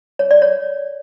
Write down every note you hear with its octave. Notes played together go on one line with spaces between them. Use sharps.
C#5
D5
C#5